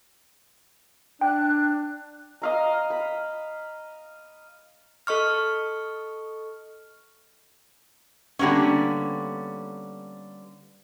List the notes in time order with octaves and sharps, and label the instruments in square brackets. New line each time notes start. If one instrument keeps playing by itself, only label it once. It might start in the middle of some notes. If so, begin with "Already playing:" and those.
[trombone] D4 [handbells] G5 [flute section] F#6
[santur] D#5 F5 A#5
B5
[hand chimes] A4 D#5 C#6 F6
[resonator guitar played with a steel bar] D3 G3 A#3 B3 C#4